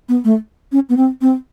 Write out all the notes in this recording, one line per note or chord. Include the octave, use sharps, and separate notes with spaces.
B3
A3
C#4
B3
C4
C4